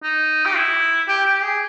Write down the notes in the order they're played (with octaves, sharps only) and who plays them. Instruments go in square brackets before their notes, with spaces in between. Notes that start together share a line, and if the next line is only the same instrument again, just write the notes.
[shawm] D#4
G4
E4
G4
G4
G#4